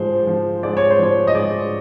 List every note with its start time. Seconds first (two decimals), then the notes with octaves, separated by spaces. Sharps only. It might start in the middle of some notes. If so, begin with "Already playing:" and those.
Already playing: G#2 F3 C5
0.27 F3
0.63 G#2 D5
0.77 C#5
0.91 C5
0.99 F3 C#5
1.27 D#5
1.35 G#2 D5